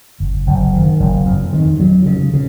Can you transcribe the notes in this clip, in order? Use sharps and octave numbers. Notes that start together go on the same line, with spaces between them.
F#1
F#1
D#3
F#1
F2
D#3
F#3
C#3
C#3